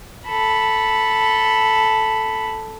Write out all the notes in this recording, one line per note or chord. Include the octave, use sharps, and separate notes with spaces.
A4 B5